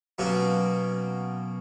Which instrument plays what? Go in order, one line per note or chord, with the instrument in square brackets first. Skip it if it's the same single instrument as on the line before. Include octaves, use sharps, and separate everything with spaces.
[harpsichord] B2 F#3 A#3 C#4 F#4